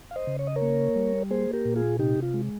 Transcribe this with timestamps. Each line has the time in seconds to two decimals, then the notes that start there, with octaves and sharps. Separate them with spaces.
0.11 F5
0.16 C5 D#5
0.27 C#3
0.39 C#5
0.47 D#5
0.56 A#4 C#5
0.62 A#3
0.96 G3
1.30 A#3 G#4 C5
1.53 G4 A#4
1.65 A#2
1.76 F4 G#4
1.99 C3 D#4 G4
2.22 F4
2.34 G#3